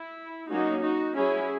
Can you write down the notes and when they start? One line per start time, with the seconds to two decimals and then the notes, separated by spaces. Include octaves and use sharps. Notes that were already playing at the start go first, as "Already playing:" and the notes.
Already playing: E4
0.50 F#3 A#3 C#4 D#4 F#4
0.83 D#4 F#4
1.16 F#3 C#4 E4 G#4